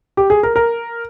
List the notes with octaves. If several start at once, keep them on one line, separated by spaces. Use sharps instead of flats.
G4
G#4
A#4
A#4